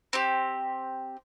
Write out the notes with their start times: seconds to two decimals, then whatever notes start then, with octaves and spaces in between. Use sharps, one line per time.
0.13 C4 G4